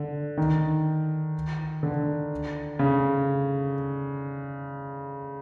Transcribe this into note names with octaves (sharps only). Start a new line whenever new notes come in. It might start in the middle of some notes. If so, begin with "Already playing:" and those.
Already playing: D3
D#3
D3
C#3